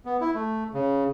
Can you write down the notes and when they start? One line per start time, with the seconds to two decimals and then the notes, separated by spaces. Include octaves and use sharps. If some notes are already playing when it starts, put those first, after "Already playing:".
0.05 B3
0.21 E4
0.35 A3
0.74 C#3